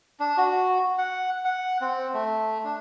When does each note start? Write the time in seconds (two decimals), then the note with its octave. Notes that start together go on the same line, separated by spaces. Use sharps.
0.20 D4
0.37 F#4
0.98 F#5
1.45 F#5
1.81 C4
2.14 A3
2.64 D4